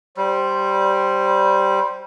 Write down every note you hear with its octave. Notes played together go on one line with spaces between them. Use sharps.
G3 C5